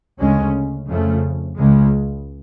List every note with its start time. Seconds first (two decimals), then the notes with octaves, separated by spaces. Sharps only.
0.18 D2 C#3 G#3 C#4
0.87 F2 C#3 F3 A3
1.57 C#2 C#3 G#3